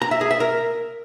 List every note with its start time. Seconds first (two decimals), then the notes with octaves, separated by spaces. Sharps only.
0.02 A#5
0.11 E5
0.21 G#4
0.31 E5
0.40 A#4